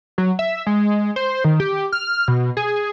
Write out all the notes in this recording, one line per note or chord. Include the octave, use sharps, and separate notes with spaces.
F#3
E5
G#3
C5
D#3
G4
F6
B2
G#4